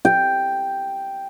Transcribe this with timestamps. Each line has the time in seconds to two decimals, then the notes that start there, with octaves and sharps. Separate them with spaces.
0.05 G5